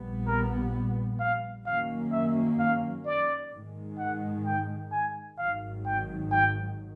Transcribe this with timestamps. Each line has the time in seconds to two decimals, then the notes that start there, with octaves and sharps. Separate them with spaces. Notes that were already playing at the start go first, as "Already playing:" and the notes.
Already playing: A#1 A#2 G3 B3
0.27 A#4
1.19 F5
1.66 F#2 D#3 F#3 A#3 C#4 F5
2.12 E5
2.59 F5
3.05 D5
3.52 G#2 D#3 G#3
3.99 F#5
4.46 G5
4.92 G#5
5.38 G#1 G#2 D#3 F#3 F5
5.85 G5
6.31 G5